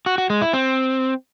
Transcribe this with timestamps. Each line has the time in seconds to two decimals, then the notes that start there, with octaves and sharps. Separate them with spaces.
0.06 F#4
0.18 F#4
0.30 G#3
0.42 E4
0.53 C4